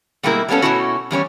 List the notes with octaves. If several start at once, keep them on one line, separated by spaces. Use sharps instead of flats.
B2 G3 G#3 A#3 E4 A#4
G3 A#3 B3 C#4 A4
B2 G3 A3 C#4 E4 F#4
E2 G3 C#4 C#5